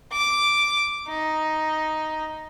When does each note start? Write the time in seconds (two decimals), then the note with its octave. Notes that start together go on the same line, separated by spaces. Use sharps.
0.12 D6
1.09 D#4